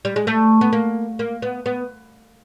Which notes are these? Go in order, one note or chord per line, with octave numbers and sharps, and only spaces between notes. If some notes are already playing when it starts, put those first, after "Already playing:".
G3
G#3
A3
B3
A#3
A#3
B3
B3